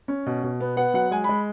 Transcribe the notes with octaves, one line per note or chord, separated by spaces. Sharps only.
C#4
B2
B2
B3
B3 F#5
F#3 F#5
G#3 G#5
G#3 B5